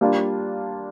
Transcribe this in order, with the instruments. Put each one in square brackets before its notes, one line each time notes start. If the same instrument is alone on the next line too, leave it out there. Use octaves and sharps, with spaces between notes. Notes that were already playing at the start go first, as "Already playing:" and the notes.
[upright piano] G3 A#3 D4 F4